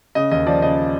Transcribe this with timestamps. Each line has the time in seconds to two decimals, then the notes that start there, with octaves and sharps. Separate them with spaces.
0.15 C#3 D#5
0.31 D#2 D#5
0.47 F3 D5
0.62 C#3 D#5